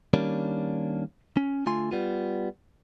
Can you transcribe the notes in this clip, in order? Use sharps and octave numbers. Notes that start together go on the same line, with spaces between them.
D#3 G3 A#3 C#4 D4
C#4
D3 A3 F4 G#5 C6
G3 B3 F4